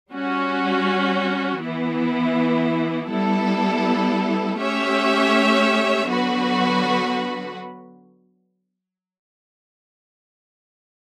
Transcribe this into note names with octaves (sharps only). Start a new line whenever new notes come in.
G3 C#4 F#4
E3 B3 E4
G3 B3 E4 A4
A3 C#4 G4 C#5 E5
D3 F#3 B3 F#4 B4